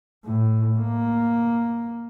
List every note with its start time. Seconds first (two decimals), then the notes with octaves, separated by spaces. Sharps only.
0.25 A2
0.78 A#3